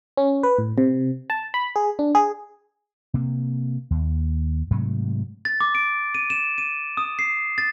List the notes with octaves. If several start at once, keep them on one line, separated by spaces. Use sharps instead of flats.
C#4
B4
A2
C3
A5
B5
G#4
D4
G#4
C3 A#3
D#2
G#2 C3 F#3 A3
A6
D6
D7
D#7
E7
D#7
D#6
C7
A6